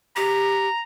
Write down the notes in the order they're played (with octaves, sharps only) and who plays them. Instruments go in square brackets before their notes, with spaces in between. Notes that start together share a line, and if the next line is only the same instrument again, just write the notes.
[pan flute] G4 [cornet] A#5